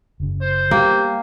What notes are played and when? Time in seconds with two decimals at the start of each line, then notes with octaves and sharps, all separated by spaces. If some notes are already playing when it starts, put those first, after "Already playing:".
0.20 F#1 C#3
0.42 C5
0.71 G3 A#3 B3 G4